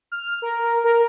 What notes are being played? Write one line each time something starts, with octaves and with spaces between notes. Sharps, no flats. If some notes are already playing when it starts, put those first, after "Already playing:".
F6
A#4
A#4